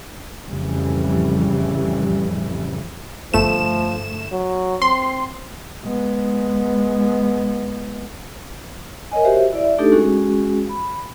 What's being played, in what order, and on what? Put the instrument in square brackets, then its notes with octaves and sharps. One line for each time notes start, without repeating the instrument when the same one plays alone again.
[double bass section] F2 A2 C#3 E3 G3
[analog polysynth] G1 A3 E7 [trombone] F3
[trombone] F#3
[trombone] C4 [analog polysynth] C6
[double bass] G#3 B3
[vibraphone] A#4 C#5 D#5 G#5
F#4 G4 C5 C#5 E5
E4 D5 E5
A3 D4 D#4 G4 A4
G#3 C#4 F#4 G#4
B5